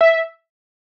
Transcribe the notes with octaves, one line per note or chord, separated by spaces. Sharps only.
E5